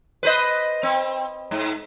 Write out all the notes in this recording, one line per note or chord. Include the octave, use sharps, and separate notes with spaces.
B4 C5 D#5
C4
G#2